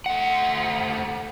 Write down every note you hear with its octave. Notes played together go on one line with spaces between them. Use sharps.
A3 F#5